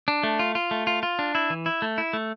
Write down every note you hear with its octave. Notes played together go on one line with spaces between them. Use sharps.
D4
A3
F4
F4
A3
F4
F4
D4
E4
E3
E4
A3
E4
A3